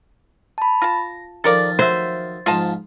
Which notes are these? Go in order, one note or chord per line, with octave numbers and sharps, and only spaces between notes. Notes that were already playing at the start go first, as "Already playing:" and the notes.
A5 B5
F4 A5 A#6
D#3 F3 A4 A#4 D5 A6
F#3 C5 E5
G#2 F3 F4 D#5 A5